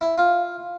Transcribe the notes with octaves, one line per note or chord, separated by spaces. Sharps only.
E4
F4